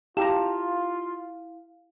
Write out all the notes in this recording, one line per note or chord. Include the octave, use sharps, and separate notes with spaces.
E4 F4 G4 F5 A5 A#5 E7